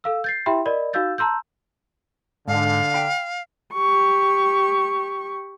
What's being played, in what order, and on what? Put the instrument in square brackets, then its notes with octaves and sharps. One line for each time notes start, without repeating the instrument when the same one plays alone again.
[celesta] A4 F5 E6
G6 A6 C7
E4 G4 E5 G5 B5 C6
A#4 D5 D#5 B5
D#4 F#4 F5 E6 G6 A6
A5 A#5 C6 E6 G6
[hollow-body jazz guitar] G#2 [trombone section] D3 [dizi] F5
[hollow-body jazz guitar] G5 B5
[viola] G4 C#6